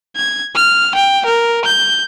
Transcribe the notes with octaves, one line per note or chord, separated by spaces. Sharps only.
G#6
F6
G5
A#4
G6